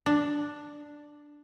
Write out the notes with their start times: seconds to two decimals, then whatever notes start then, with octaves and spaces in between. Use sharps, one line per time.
0.06 D4